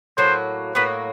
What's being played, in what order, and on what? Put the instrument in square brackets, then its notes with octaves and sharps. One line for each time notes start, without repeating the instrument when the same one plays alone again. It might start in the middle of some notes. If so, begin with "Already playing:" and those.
[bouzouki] A2 F#3 A#3 [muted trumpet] C5
[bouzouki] A2 F#3 A#3 [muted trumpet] B4